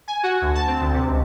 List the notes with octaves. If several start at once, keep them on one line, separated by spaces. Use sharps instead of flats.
G#5
F#4
D2
A5
C4
D2
C3
C#2